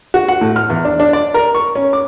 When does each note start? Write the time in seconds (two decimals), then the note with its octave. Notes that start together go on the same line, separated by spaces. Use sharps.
0.14 F#4
0.28 F#5
0.41 A2
0.56 F6
0.70 E2
0.85 D4
1.00 D4
1.13 D5
1.34 A#4
1.55 C#6
1.75 C#4
1.93 D6